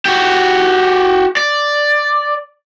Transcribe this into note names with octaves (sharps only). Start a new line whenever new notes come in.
F#4 G4
D5